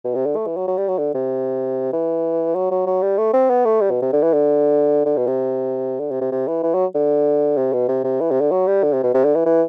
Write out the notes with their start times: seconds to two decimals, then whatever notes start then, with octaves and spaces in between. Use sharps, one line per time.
0.04 B2
0.15 C3
0.26 D3
0.36 A3
0.47 E3
0.57 F#3
0.68 F#3
0.77 G3
0.88 F#3
0.98 D3
1.14 C3
1.93 E3
2.55 F#3
2.71 F#3
2.87 F#3
3.02 G3
3.18 A3
3.33 C4
3.50 B3
3.65 A3
3.81 G3
3.91 B2
4.02 C3
4.13 D3
4.22 E3
4.33 D3
5.06 D3
5.17 B2
5.27 C3
6.00 D3
6.11 C3
6.21 C3
6.32 C3
6.47 E3
6.63 E3
6.74 F#3
6.95 D3
7.57 C3
7.73 B2
7.88 C3
8.04 C3
8.21 E3
8.31 C3
8.41 D3
8.52 F#3
8.67 G3
8.83 D3
8.93 C3
9.03 B2
9.14 C3
9.24 D3
9.35 E3
9.46 E3